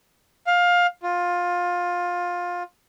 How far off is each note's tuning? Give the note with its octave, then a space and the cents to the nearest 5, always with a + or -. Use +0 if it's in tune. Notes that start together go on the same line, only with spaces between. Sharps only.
F5 +20
F4 +20